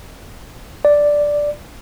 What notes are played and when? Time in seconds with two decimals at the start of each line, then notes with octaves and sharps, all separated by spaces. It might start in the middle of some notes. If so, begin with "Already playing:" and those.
0.85 D5